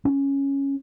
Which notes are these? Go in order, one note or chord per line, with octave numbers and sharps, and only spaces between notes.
C#4